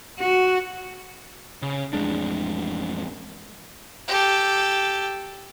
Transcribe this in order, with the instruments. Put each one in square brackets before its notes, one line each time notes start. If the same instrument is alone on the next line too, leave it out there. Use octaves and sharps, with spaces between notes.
[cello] F#4
[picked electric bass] C#3
A1 F2 G#3 D4
[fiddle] G4 A4